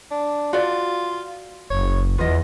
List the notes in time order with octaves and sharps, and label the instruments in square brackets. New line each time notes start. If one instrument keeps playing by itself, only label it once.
[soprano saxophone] D4
[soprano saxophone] F4 [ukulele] F#4 D5
[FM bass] F#1 [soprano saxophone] C#5
[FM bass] E2 [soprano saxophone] B3 [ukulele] F4 D#5